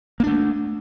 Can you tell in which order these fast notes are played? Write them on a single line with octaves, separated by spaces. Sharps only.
A#3 D4 A3